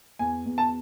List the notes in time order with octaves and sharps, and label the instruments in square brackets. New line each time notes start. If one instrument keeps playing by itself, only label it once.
[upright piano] E2 [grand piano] G#5
[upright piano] E2
[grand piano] A5